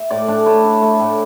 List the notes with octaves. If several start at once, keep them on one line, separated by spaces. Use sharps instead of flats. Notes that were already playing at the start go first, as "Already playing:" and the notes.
Already playing: E5
A2 D5
A2 D4
A3 E4
D4
A3
A2